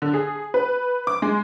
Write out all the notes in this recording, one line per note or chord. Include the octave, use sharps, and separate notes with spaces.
D3
G#4
B4
D6
G#3